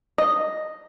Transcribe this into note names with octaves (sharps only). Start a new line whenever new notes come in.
D#5